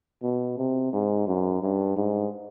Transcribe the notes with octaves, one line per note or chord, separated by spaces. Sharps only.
B2
C3
G#2
F#2
G2
G#2